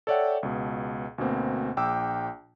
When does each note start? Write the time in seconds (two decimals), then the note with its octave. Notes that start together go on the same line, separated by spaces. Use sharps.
0.07 A4 C#5 D5 E5 F#5 G5
0.43 C#2 B2
1.18 D2 B2 A#3 C4
1.77 A#1 G5 D6 E6